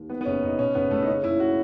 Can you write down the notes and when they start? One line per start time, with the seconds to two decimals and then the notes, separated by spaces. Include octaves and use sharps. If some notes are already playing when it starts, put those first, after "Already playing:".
Already playing: D#2
0.10 D#3 B3
0.21 B3
0.25 F#1 C#4
0.43 F#1 D#4
0.58 B2 C#4
0.75 F#1 B3
0.90 F#1 A3
1.02 D#4
1.07 C#3 C#4
1.24 F#1 E4
1.40 F#4